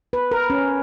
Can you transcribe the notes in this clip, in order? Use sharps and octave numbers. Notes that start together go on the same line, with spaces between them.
B4
A#4
C#4